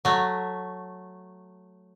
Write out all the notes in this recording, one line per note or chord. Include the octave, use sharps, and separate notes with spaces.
F#3 A3